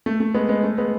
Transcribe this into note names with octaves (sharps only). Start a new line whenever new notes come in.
A3
A3
G#3 B3
G#3 B3
A3
G#3 B3